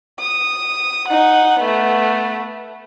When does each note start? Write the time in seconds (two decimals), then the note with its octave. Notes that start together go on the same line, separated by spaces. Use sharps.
0.20 D#6
1.09 D#4 F#5
1.60 A3 B3